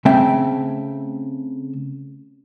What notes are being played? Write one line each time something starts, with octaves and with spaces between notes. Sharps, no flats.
C#3 A3 C4 E5 G5